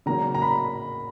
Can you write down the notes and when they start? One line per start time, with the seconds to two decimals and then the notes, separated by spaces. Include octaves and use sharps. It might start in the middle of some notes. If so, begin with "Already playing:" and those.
0.06 C#3 F#3 A#3 C#4 A#5
0.35 A#5
0.42 B5